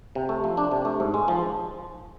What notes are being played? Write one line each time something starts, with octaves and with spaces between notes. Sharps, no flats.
C3
A3
F3
D4
C3
A3
G#2
G#3
F3